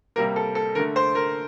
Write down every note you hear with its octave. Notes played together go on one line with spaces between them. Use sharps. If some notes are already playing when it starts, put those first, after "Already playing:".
C3 G3 A#3 A#4
A4
A4
D3 A3 A#4
C5
A#4